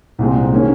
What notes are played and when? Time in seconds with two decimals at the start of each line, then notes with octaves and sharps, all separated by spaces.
0.19 C2 A#2 G#3 C4
0.52 D#3 A#3 C#4